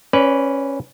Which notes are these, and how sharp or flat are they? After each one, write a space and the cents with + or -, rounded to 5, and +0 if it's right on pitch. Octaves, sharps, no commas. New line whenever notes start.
C#4 -10 B4 +0 D5 -25